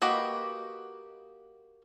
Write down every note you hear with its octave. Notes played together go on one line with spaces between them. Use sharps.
A#3 F#4 G4 B4 D#5